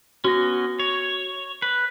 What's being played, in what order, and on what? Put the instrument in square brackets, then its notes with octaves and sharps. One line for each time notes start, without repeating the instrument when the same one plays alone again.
[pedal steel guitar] B3 C#4 [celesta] F#4 A#6
[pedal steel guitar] C#5
B4